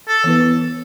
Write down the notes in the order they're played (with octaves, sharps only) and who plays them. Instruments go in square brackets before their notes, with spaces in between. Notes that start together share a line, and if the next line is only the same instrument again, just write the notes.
[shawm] A4
[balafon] E3 B3 E4 B4